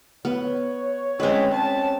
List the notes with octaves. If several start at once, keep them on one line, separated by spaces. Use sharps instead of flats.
B3 C#5
G#3 C4 C#4 B4
C#4 A5